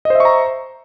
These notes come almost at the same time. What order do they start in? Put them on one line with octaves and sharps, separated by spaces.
D#5 C5 E5 C#6 A#5